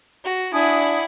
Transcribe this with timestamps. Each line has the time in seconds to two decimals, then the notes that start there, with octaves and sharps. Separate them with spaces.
0.23 F#4
0.52 D4 E4 F#5 G#5 D#6